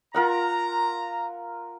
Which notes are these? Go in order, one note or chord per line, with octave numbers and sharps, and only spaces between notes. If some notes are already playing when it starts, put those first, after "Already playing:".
F4 A#4 F#5 A#5